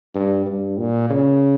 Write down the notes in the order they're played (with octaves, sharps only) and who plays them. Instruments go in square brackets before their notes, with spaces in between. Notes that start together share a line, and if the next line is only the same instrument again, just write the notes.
[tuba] G2
G2
A#2
C#3